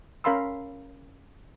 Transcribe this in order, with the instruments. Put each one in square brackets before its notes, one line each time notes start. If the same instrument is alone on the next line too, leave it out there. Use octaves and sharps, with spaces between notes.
[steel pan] C#4 A#4 F5 B5 C6 E6